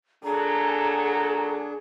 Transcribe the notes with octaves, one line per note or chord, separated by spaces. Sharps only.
A#2 F#3 D4 G#4 A4 A#5